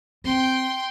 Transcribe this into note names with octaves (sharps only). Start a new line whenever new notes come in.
C4 G5 C6